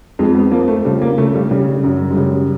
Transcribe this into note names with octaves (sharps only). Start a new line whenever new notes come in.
F2 G#3
B3
F3 A#3
A3
C#3 G3
A#3
C#3 A3
G3
C#3 G3
F#2
G#3
C#3 G3